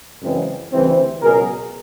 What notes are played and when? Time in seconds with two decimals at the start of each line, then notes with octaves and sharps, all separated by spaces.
0.22 F#2 C#3 E3 G#3 C4
0.72 D2 C#3 E3 G3 C4
1.23 C#2 B2 F#3 G#4 A#4